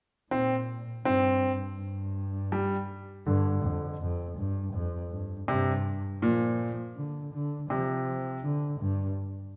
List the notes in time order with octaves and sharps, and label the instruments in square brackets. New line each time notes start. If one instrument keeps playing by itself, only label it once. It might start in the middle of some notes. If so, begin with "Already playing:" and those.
[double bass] A#2 [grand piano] C4
[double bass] G2 [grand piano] C4
[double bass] G2
[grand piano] G3
[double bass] G2 [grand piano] D3
[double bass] F2
F2
G2
F2
G2
[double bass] G2 [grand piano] C3
[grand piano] A#2 [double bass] F3
[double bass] D3
D3
[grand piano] C3 [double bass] F3
[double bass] D3
G2